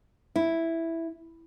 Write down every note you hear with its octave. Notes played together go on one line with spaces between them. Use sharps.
E4